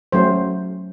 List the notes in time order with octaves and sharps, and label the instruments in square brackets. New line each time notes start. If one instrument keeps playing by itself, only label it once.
[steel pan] F#3 A3 C#4 C5